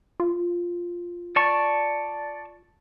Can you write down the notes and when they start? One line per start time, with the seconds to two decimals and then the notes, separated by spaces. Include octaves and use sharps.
0.20 F4
1.36 D5 A5 C#6